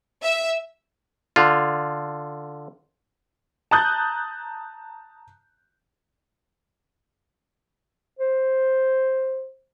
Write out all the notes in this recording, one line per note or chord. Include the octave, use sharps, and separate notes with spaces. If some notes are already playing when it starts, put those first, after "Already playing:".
E5
D3 F4
A5 A#5 D#6 F#6 G6 A6
C5